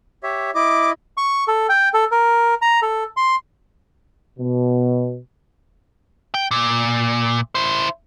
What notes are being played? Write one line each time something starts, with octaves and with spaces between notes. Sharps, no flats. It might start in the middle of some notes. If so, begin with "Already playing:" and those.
G4 C#5 E5
E4 D#5 D6
C#6
A4
G5
A4
A#4
A#5
A4
C6
B2
G5
A#2
E4 C5